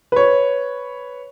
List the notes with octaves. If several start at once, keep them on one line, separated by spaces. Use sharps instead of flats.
B4 C#5